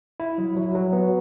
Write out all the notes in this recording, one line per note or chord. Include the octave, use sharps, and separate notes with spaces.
E4
F#3
F#3
F#3
B3